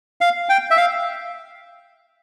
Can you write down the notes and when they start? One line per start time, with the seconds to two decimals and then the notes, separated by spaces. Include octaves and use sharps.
0.21 F5
0.49 G5
0.71 E5
0.77 F5